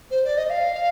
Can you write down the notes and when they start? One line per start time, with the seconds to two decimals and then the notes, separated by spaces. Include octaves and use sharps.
0.11 C5
0.24 D5
0.37 D#5
0.50 F5